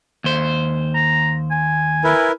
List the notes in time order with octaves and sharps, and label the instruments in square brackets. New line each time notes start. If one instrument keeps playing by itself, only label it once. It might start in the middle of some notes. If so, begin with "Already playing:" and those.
[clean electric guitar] D#2 C5
[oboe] A#5
G#5
[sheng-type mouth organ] E4 A#4 B4